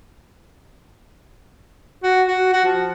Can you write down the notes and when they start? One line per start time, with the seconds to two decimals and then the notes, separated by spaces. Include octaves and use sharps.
2.03 F#4
2.28 F#4
2.53 F#4
2.65 F3